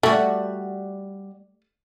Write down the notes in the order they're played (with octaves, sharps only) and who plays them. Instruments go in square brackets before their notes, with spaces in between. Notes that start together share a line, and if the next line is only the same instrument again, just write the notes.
[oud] G3 F#4 [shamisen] A3